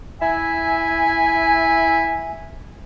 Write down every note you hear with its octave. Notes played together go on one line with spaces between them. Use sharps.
E4 E5 G#5